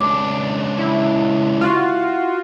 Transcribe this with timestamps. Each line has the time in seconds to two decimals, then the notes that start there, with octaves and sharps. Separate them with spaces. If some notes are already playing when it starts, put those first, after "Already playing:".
0.01 C#2 D4 D6
0.78 E4
1.61 F4 F#4